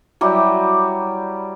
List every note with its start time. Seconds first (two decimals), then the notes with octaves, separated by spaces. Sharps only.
0.21 F#3 G3 E4 G4